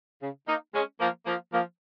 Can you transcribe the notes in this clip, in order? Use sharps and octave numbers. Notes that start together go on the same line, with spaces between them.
C#3
A#3 D#4
G#3 C#4
F3 A#3
F3 A#3
F3 A#3